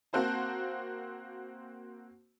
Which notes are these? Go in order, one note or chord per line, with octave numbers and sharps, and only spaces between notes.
A#3 C4 F#4 C5 A5